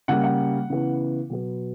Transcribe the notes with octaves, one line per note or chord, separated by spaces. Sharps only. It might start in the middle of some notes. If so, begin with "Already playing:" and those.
C#3 G3 A#3 F#5
F#5
C#3 E3 B3
B2 F#3 B3